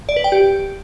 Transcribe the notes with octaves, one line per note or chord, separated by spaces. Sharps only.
D5
B4
G5
G4